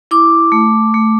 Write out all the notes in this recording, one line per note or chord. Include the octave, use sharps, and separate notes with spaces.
E4 D6
A3
A3